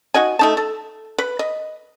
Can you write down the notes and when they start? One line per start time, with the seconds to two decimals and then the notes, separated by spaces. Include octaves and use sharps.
0.14 D#4 F#4 D#5 G#5
0.39 A3 D#4 A5
0.57 A4
1.18 B4
1.39 D#5